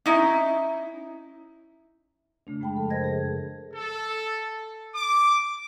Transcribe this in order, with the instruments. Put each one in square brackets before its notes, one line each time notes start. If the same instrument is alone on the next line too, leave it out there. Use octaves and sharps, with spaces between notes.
[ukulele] C#4 D#4 E4
[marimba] C#3 A3 D4
F#2 G#3 G#4 G5 A5 B5
C#3 F3 A4
A#4 C5 D#5 G#6 A#6
G#4
[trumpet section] A4
D6